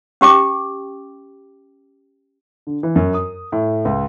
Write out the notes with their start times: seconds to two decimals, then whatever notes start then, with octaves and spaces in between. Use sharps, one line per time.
0.21 C#4 G4 G5 D6
2.67 D3
2.83 E3
2.96 F#2
3.14 D#6
3.52 A2
3.85 C#2